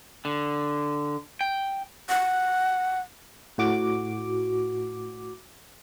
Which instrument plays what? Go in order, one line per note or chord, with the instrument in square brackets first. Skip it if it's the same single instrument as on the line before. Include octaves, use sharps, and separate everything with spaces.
[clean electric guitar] D3
G5
[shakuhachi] F#5
[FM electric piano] A2 F#4 D6